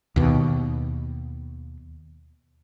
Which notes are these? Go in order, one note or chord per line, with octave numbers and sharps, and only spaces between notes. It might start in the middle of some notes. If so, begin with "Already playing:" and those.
D#2 B2